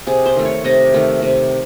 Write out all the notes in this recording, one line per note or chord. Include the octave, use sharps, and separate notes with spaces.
C3 G#4
C5
D#3 A3
C#5
C3 D#5
D#3 A3
C3